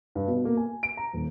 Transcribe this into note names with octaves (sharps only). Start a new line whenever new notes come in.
G2
B2
A#3
G#5
D7
A#5
D#1